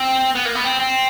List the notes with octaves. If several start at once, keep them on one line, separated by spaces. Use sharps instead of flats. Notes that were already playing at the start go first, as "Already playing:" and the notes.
Already playing: C4
B3
A#3
B3
C4
C4